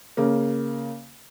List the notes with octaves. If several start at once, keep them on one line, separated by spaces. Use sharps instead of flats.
C#3 A#3